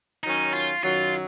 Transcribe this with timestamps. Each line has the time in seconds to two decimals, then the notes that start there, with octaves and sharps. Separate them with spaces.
0.23 D#3 F#3 C#4 D#4
0.54 F4
0.83 F#2 D#3 F#3 F4